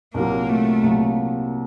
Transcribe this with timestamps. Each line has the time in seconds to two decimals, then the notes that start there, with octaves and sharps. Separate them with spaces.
0.14 C2 A#2 F#3 A#3
0.49 A3
0.83 C2 A#2 F#3